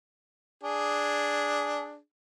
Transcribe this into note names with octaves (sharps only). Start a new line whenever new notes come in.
D4 G#4